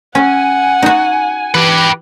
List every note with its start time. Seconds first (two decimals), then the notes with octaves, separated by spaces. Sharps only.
0.15 C#4 F#5 G#5
0.82 D#4 F#4
1.54 E3 G4 B4